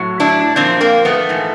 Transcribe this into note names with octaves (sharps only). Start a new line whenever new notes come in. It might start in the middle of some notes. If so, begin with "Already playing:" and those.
Already playing: A2 F#3
D4 E4
A#2 F3 C4 D4
A#3 C4
A3 B3
G#2 E3